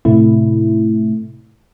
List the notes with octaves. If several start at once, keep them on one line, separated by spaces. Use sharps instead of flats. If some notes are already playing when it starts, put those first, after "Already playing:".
A2 C3 A3 E4